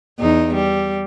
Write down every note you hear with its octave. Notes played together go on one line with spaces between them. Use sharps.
E2 D#4
G3